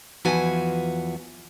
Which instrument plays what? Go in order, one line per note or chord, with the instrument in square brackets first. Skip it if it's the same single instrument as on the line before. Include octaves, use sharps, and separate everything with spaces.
[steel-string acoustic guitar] E2 F3 F4 F#4 B4 G#5